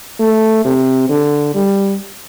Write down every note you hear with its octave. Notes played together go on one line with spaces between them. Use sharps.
A3
C3
D3
G3